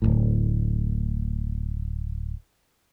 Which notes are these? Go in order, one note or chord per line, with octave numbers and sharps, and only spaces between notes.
D1 G#1 A2